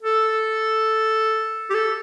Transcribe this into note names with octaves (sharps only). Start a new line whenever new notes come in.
A4
G4
A4